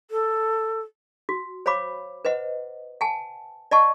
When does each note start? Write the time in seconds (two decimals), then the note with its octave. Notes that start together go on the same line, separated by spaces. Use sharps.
0.11 A4
1.29 F#4
1.66 C5 C#5 F5 B5 D6
2.25 B4 C5 D#5 F#5
3.01 F#5 G#5 A5
3.71 D5 D#5 F#5 A5 C#6